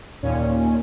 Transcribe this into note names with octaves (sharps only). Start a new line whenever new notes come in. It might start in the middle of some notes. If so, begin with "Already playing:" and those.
D#2 A#2 C#4